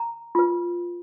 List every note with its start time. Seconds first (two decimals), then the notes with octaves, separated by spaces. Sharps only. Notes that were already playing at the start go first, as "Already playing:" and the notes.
Already playing: A#5
0.35 F4 B4